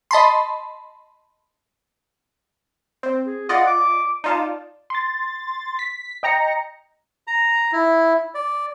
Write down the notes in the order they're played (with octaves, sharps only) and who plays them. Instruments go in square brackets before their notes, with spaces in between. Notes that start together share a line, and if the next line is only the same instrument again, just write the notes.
[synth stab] D#5 A5 B5 C6
C4
[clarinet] G#4
[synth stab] F4 D5 D#5 [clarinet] F#5
[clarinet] D6
[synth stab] D#4 F4 A5 [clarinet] D5
[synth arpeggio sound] C6 A6
B6
D#5 G5 A#5 A#6 C#7
[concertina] A#5
E4
D5